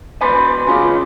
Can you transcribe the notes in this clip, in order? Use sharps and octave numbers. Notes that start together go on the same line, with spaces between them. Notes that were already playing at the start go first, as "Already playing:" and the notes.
B2 B4 D5 G#5 B5 C6
C#3 G#3 F4 F5 D6